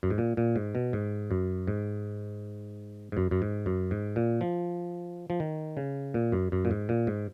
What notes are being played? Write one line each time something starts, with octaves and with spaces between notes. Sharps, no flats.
F#2
G#2
A#2
A#2
G#2
B2
G#2
F#2
G#2
G#2
F#2
F#2
G#2
F#2
G#2
A#2
F3
F3
D#3
C#3
A#2
F#2
F#2
A#2
G#2
A#2
G#2